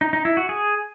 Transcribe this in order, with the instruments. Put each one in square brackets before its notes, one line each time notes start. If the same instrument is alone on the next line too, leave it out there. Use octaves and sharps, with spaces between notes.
[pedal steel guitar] D#4
D#4
E4
F#4
G#4